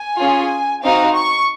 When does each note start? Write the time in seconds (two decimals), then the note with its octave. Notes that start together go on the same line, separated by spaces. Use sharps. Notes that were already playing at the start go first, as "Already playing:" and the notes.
Already playing: G#5
0.21 C#4 F4 G#4
0.83 C4 D#4 F#4 F5
1.14 C#6